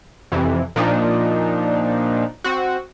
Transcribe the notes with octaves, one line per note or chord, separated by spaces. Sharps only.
F2 C3 E3
A#2 F3 D4 D#4
C4 F#4